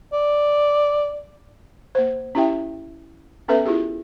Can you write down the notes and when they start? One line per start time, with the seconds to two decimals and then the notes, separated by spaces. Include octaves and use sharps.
0.13 D5
1.95 A#3 C5
2.35 C#4 E4 G4 E5 G5
3.48 B3 C#4 A4 B4 E5
3.65 E4 F4 G4 G#4